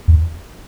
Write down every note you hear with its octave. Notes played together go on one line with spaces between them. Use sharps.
E2